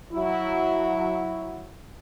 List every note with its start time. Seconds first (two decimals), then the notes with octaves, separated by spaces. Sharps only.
0.12 F#3 E4